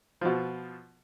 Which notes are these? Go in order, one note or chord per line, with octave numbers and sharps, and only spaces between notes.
B2 F3